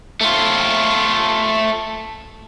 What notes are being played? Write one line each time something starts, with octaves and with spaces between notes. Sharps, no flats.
A3 F4